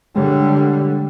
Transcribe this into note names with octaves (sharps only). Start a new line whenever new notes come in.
D3 G3 G#3 C#5